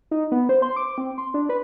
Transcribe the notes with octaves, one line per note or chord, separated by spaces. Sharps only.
D#4
B3
C5
C6
D6
C4
C6
D4
B4